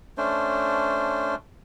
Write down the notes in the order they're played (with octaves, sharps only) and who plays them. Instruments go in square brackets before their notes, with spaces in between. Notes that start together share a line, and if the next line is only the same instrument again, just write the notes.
[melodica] A3 C#4 D4 C5